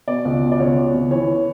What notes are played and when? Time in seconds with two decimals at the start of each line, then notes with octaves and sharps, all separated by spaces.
0.08 B2 D5
0.25 C#2
0.43 B2
0.52 D5
0.60 C#2 C#5
0.77 B2
0.94 C#2
1.11 E3 C#5